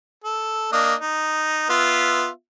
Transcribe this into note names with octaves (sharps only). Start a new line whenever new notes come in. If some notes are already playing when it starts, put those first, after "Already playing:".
A4
A#3 D4 D#5
D#4
B3 F4 E5